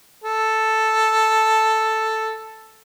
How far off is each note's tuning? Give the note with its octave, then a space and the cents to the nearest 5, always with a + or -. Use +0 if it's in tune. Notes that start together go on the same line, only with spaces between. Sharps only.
A4 +0